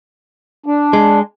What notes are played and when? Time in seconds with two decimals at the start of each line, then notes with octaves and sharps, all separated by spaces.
0.66 D4
0.93 G#3